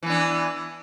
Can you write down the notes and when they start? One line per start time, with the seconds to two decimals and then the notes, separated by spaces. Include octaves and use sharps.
0.03 E3
0.06 B3
0.10 D4